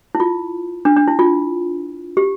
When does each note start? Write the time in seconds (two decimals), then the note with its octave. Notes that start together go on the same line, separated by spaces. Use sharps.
0.15 E4
0.20 F4
0.85 D4
0.97 D4
1.08 E4
1.19 F4
2.17 G4